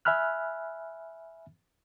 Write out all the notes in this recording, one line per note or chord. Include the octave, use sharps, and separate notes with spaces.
E5 G#5 B5 F6 F#6